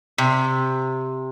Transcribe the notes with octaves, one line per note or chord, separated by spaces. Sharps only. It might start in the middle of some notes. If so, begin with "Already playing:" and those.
C3